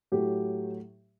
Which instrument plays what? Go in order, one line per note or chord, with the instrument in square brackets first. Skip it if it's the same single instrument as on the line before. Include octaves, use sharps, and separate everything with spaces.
[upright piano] A2 F#3 A3 G4